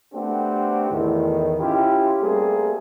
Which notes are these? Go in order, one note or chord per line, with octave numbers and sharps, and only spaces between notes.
A3 B3 C4 D4 F#4 G4
E2 A2 D#3
C#4 E4 F4 G4
G3 A3 A#3 C4 G#4